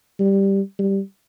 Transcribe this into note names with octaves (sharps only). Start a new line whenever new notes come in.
G3
G3